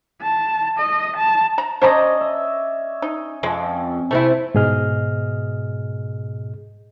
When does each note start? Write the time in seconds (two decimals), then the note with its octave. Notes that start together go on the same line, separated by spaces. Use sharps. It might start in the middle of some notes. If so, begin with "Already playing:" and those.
0.22 A5
0.79 D#5
1.16 A5
1.58 A#5
1.81 C#4 C5 D5 D#5 A5 A#5
2.21 E5
3.02 D#4
3.43 F2 G#3
4.11 C3 A3 C4 E4
4.55 G#2 B2 G#4 D#5 F6